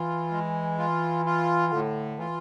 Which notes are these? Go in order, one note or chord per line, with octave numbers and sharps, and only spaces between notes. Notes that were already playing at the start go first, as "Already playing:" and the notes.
Already playing: E3 F4
G#3
F4
F4
A2 D3
E3 F4